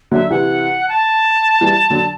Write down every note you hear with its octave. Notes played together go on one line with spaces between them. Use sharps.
D3 F#3 E5
C3 E3 F#5
A5
E3 G3
D3 F#3